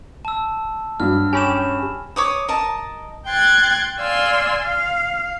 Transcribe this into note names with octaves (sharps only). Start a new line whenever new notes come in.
A5 E6
G2 F#3 F6
C#4 G4 G#5 B5 E7
C#5 D6 D#6
A#4 D#5 A5
G5 C6 F#6 G#6 A6
D5 F5 G#5 C6 E6
F5